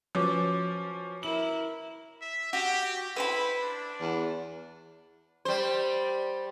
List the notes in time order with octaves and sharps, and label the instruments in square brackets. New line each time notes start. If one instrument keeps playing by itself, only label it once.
[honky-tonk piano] F3 [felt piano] C#4 [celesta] F#4 B4 D6
[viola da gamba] E4 A#4 [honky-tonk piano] F#7
[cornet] E5
[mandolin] F#4 [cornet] G4
[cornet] E4 [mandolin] B4 C5 B5
[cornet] D4
[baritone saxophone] E2
[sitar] G3 C5